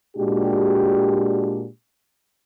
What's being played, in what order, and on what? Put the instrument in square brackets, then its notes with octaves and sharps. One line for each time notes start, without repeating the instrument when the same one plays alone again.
[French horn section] A#2 G#3 D4 F#4 G4